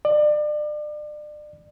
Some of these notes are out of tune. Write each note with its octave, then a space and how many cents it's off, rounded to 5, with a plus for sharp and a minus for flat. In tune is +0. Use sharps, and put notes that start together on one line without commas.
D5 +35